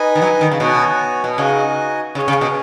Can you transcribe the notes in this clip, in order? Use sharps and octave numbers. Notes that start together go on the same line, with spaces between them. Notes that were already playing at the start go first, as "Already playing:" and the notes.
Already playing: D#4 B4 D#5 G#5
D#3
F#3
D#3
C#3
B2 B3 F#4 C#5 G#5
B2
C#3 D#4 F#4 D#5 G#5
C#3 C#4 G#4 C#5
C#3
B2